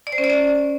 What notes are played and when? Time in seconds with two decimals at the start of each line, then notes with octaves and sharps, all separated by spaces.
0.07 D5
0.12 C5
0.18 C#4
0.24 D5
0.30 C#4